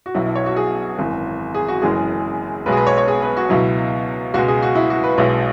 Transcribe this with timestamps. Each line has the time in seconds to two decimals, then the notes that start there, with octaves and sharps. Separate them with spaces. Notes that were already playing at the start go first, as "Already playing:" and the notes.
0.06 F#4
0.14 B1 B2 F#3 E4
0.26 E4
0.35 C#5
0.46 F#4
0.56 G#4
0.99 G#1 F#2 E3
1.55 G#4
1.68 F#4
1.82 F#1 F#2 E3 G#3 G#4
2.66 B1 B2 G#3 B4
2.72 G#4
2.77 B4
2.87 C#5
2.98 C#5
3.08 G#4
3.22 B4
3.37 F#4
3.50 C#2 B2 F#3 E4
4.34 C#2 B2 G#3 F#4
4.48 G#4
4.63 F#4
4.75 E4
4.90 F#4
5.04 B4
5.18 B1 B2 G#3 E4